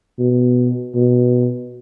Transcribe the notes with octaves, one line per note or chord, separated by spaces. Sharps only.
B2
B2